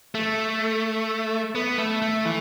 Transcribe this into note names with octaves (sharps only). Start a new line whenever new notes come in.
A3
B3
A3
A3
E3